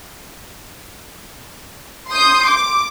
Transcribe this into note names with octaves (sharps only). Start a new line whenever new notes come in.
C6 D#6 G6
D6